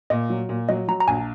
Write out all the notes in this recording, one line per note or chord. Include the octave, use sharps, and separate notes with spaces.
A#2 D#5
F#3
A#2
F#3 D#5
F#3 A#5
A#5
A#1 G#5